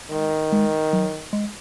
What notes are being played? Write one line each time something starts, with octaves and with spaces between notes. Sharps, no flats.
D#3 G#3
G#3
F#3
G#3